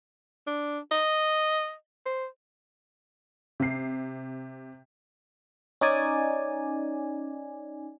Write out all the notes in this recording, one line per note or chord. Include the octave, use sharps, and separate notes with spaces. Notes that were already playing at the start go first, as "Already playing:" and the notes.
D4
D#5
C5
C3 C7
C#4 D#4 D5 G#5